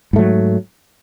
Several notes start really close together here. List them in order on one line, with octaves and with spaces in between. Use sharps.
G#2 A3 F#3